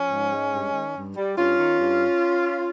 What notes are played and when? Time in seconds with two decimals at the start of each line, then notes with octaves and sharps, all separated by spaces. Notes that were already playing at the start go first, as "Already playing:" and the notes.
Already playing: F3 C#4
0.09 G#2
0.30 G#3
0.52 G2
0.73 D#3
0.94 G2
1.15 G3
1.37 G2 C#4 F4
1.58 D#3
1.80 G2